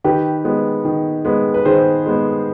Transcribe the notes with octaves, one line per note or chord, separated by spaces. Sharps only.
D#3 G4 B4
G#3 B3
D#3
G#3 B3
B4
D#3 G#4 C5
G#3 B3